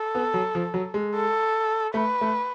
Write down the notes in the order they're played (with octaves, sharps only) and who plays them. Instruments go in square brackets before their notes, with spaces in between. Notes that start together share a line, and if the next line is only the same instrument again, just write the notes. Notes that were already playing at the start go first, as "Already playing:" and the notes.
Already playing: [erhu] A4
[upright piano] B3
F#3
F3
F#3
G#3
[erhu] A4
[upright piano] A3 [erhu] B4
[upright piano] A3